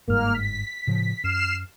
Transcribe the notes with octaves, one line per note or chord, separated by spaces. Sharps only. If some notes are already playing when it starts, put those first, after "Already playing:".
G1 G#2 G3 A#3 F6
B6
A2 C#3 F3
F#2 F6 C7 E7